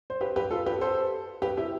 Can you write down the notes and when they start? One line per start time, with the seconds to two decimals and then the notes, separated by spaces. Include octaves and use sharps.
0.10 C5
0.21 G4 B4
0.36 G4 B4
0.51 F4 A4
0.66 G4 B4
0.81 A4 C5
1.42 G4 B4
1.57 E4 G4